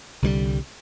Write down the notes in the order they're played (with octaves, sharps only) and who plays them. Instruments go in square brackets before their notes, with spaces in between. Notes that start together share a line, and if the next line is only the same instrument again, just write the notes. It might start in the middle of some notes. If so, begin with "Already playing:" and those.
[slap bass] C2 D3 D#3 G3